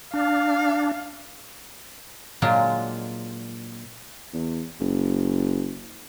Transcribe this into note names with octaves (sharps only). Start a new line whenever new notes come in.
D4 F5
A#2 F#3 G#3 D4 F4 G#4
E2
F#1